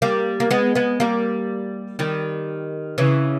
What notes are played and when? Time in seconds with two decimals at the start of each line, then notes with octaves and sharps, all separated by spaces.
0.02 G3 A#3
0.40 A#3
0.51 G#3 B3
0.75 G#3 B3
1.00 G3 A#3
1.99 D#3 G3
2.98 C#3 E3